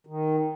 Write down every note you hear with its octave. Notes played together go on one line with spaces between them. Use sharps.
D#3